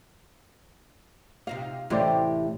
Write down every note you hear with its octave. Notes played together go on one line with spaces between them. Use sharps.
C3 D#4 F4 F5
A1 A2 C3 D#4 E4 G4 C5 D5